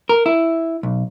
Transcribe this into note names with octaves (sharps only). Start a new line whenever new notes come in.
A#4
E4
B1